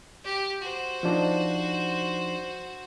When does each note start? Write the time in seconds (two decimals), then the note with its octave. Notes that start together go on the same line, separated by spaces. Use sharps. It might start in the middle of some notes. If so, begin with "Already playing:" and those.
0.24 G4
0.62 F#4 C5
1.03 F3 D4 D#4